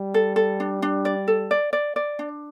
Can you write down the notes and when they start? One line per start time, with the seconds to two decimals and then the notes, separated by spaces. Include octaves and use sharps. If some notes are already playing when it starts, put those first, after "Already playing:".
Already playing: G3
0.14 A4
0.36 A4
0.60 D4
0.82 D4
1.05 D5
1.28 A4
1.51 D5
1.73 D5
1.96 D5
2.19 D4